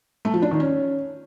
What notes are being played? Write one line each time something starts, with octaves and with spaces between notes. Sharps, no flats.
A3
F3
D4
D#3
C#4